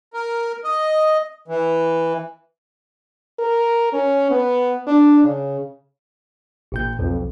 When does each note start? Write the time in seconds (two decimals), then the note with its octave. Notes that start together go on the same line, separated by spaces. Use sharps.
0.14 A#4
0.64 D#5
1.48 E3
3.39 A#4
3.93 C#4
4.30 B3
4.87 D4
5.24 C#3
6.72 A1 A#2 G6
6.99 B1 F2